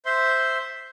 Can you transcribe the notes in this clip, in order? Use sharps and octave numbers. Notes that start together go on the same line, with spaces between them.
C5 E5 C6